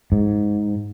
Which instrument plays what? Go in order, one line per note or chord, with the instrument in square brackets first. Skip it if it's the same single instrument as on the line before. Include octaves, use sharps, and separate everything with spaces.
[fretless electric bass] G#2